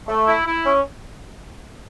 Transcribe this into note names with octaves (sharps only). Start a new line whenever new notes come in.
A3
E4
E4
C#4